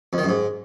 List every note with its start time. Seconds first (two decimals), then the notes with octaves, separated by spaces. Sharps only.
0.13 F2
0.18 D#3
0.23 F#2
0.29 G#2